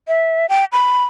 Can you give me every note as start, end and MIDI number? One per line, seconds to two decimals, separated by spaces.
0.08 0.46 76
0.49 0.65 79
0.72 1.04 83